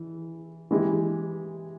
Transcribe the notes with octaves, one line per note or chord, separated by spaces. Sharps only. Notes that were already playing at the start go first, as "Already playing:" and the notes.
Already playing: E3
E3 G#3 E4 G4